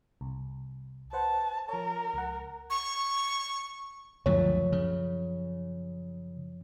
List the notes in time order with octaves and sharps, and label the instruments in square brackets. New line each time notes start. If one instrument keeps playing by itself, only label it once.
[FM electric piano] C2
[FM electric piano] B4 C5 F#5 [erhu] A5
[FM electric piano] F3 C#5 [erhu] A#4
[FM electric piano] C#2 F#5
[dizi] C#6
[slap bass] C#2 D3 A3 [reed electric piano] F#2 F3 C#5
[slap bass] C#3